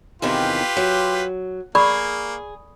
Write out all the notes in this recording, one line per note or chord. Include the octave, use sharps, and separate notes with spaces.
E2 C3 D#3 F4 G4 B4
F#3
A#3 G#4 D5 B5 C#6